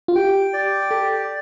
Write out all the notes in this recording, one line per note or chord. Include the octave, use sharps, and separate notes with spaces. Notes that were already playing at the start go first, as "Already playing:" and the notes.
F4
G4 G5
D5
G4 A4